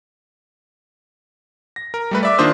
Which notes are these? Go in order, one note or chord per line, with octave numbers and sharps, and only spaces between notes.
A#6
A#4
G3 A3 B4
D5 E5 D6
D#3 A#3 D4 F4 C5 D#6